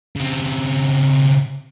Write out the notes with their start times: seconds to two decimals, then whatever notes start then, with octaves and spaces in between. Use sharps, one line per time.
0.16 C#3 C4